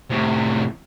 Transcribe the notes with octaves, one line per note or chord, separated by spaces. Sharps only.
A2 C3